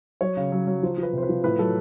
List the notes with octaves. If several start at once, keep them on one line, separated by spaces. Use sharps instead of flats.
F#3 C#5
C#3
F#3
F#3
F3 C5
F3
B4
C3 C5
B4
F3
A2 B4
F#3 A4